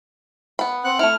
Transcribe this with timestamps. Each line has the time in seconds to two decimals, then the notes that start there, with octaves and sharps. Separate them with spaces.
0.59 B3 B5
0.84 C4 F#5 F#6
0.99 A3 E4 F6